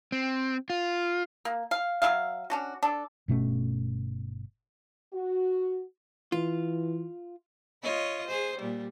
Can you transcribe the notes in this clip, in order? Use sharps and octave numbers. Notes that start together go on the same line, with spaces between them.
C4
F4
A#3
F5
F#3 F4 E5 F5
C#4 D4 F#4
D4 A4
G1 B2 A3 C#4
F#4
E3 F4
F4 C#5 D#5
G#4 C5
A#2 G3